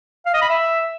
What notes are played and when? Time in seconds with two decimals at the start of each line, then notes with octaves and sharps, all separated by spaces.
0.26 F5
0.34 D#5
0.42 B5
0.50 E5